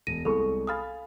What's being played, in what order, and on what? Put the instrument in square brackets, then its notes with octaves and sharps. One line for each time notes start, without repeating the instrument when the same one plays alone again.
[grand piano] E1 [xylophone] A#6 D#7
[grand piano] C2 G#3 C#6 [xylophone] A4
[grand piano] F5 G#5 B5 [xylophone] D#6 F6 A6